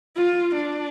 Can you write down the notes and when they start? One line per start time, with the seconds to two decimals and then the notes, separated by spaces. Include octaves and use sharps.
0.16 F4
0.54 D4